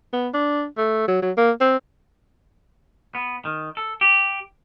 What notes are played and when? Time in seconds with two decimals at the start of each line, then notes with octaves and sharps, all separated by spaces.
0.13 B3
0.34 D4
0.77 A3
1.08 F#3
1.22 F#3
1.37 A#3
1.61 C4
3.15 B3
3.45 D#3
3.77 A4
4.01 G4